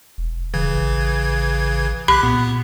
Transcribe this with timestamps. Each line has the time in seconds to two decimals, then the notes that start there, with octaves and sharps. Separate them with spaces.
0.18 E1
0.54 C#3 E3 G#6
0.75 A1
2.08 C2 G4 B5 F#6 B6
2.23 A#2 B3